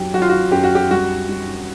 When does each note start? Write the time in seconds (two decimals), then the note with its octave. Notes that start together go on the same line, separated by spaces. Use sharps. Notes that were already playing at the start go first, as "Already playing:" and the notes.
Already playing: F#2 F#3 G4
0.14 F#3 F#4
0.22 F4
0.30 F#4
0.52 F#2 G4
0.64 F#4
0.75 G4
0.91 G3 F#4
1.29 G3